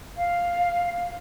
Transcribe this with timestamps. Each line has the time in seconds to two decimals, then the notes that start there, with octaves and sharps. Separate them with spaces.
0.16 F5